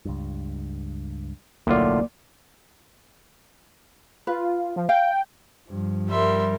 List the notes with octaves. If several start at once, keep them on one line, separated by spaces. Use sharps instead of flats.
C#2 G2
D1 B1 A2 D3 F#3 A#3 F4 D5
F4 B4
F3
F5 G5
G2 F3
G3 A#4 E5 C6